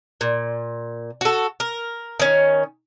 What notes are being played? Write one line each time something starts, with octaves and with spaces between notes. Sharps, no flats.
A#2
F#4 A4
A#4
D#3 C#4